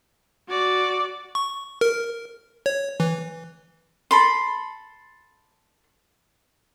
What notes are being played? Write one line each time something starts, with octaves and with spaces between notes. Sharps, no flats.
F#4 D5
C#6
A#4
C#5
E3
A4 B5 C6